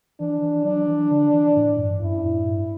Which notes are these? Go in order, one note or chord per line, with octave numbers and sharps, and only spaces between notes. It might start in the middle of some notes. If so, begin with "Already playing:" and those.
E3 D4
E3
F#3 D4
E3
D3
E3
A2
G2
F#2 E4
A2
G2